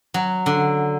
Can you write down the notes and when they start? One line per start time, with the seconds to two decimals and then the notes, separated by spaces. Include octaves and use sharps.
0.14 F#3
0.46 D3